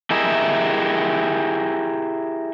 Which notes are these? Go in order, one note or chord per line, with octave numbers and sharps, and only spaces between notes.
E4 G4 G#4 A#4 D#5 E5